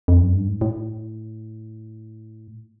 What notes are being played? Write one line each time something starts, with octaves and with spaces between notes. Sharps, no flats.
F2
F#2
G2
G#2
A2